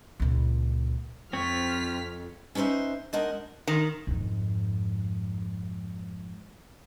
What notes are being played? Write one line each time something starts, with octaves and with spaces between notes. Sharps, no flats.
C#2 A#2
F2 C4 F4 C#5 F6 B6
C#4 D#4 B4 C5 E5
G#3 D4 D#4 A#4 F#5
D#3
F2 G#2